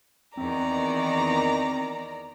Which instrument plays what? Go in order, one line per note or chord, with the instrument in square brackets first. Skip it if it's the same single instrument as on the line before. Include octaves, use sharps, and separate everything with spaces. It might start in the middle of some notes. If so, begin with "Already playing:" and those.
[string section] E2 D#3 [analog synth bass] C4 [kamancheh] D5 A#5